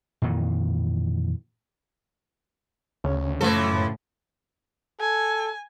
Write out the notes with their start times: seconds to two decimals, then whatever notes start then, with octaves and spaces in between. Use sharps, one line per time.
0.22 F2 A#2 D#3 E3
3.04 D2 C#3 C#4 C#5
3.41 F#2 A2 E3 F3 A4
5.01 A4 G#5